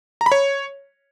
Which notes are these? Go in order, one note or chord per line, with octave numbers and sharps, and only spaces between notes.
A#5
B5
C#5